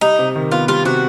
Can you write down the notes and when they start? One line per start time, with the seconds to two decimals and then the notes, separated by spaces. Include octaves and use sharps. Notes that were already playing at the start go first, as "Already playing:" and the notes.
0.01 G3 D#4
0.19 C3
0.36 D#3
0.51 B3 F4
0.68 G3 F4
0.85 C3 F#4